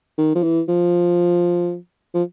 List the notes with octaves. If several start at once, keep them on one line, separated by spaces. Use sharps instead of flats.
D#3
F3
E3
F3
F3